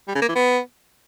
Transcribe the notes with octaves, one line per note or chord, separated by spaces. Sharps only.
G3
C#3
A#3
E3
B3